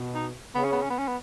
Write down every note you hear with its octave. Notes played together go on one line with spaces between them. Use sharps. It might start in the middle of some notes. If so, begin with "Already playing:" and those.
Already playing: B2
D#4
C#3 B3
C#4
B3
C#4
B3
C#4
B3